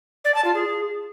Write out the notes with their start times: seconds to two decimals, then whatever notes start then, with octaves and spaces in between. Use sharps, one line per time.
0.25 D5
0.35 A5
0.45 F4
0.55 G#4